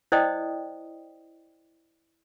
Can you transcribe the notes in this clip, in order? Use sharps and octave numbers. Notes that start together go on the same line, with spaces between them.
E4 C5 D5 D#5 G5 D#6